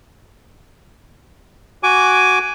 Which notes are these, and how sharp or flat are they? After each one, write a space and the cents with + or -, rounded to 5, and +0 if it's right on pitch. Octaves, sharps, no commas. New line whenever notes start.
F#4 +0 G#5 +0 D6 -15